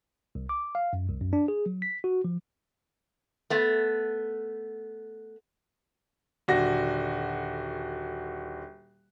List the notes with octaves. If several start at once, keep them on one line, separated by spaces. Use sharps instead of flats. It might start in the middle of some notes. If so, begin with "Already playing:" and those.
C2
D6
F5
F#2
C2
F#2
D4
G#4
F#3
B6
F#4
F3
A3 B3
D#1 D3 F#4 A#6